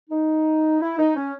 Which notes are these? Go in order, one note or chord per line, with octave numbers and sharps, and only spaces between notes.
D#4
E4
D#4
C#4